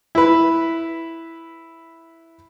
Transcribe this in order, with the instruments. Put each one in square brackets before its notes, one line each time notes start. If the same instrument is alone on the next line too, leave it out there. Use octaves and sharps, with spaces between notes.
[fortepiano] E4 B4